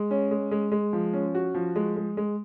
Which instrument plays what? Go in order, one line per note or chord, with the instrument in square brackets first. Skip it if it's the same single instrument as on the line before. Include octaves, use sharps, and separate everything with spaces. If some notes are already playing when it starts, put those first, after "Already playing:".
Already playing: [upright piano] G#3
C#4
G#3
G#3
G#3
F3
C#4
F#4
F3
G#3
G#3
G#3